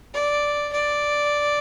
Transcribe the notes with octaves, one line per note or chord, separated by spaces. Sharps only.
D5
D5